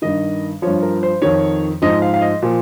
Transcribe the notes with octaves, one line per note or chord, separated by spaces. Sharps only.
G2 D#3 D#5
G2 F3 C#5
A#4
C5
F2 D#3 C#5
G#2 F3 D#5
F5
F5
D#5
A#2 F3